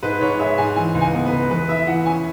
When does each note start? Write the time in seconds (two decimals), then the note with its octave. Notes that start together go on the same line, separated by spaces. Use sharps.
0.03 G#2 B4
0.21 G#2 C#5
0.39 G#3 E5
0.58 G#2 G#5
0.76 E3 G#5
0.95 C#2
1.01 G#5
1.14 B3
1.26 B4
1.32 C#2
1.50 E2 B4
1.69 E4 E5
1.87 E3 F#5
2.06 C#4 G#5